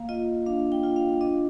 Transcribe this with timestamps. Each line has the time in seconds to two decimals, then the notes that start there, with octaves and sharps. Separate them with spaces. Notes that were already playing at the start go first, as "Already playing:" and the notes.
Already playing: A#3 F5
0.09 F4 D#5
0.46 D4 F5
0.72 G5
0.83 F4
0.96 F5
1.21 D4 D#5